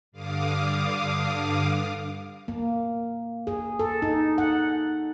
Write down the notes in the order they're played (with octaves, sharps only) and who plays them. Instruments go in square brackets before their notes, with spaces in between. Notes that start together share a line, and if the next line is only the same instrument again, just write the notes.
[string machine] G2 D3 F5 D6 D#6
[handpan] A#3
G#4
A4
D#4
F#5